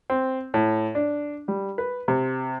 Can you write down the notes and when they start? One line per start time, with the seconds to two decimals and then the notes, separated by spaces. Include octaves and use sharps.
0.10 C4
0.54 A2
0.95 D4
1.48 G3
1.78 B4
2.08 C3